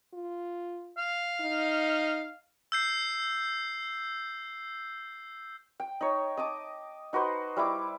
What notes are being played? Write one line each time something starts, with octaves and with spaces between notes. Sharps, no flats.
F4
F5
D#4
E6 G6 C7
G5
D#4 C#5
D#5 A5 D6 D#6
D#4 F#4 B4 C5
G3 E4 E5 D6